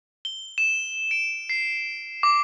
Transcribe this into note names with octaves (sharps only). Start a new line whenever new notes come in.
G7
E7
D7
C7
D6